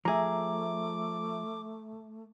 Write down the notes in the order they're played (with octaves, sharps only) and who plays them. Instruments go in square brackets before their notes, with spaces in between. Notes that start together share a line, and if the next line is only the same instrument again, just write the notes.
[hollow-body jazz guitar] F3 G#4 [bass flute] A3 [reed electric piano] E5 A#5 [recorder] D6